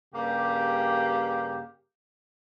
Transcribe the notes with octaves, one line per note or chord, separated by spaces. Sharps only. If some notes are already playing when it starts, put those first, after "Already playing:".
G2 C#3 A#3 G4